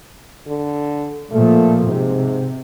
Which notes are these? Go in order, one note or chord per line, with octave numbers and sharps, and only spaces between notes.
D3
A#2 F3 A3
G#2 C3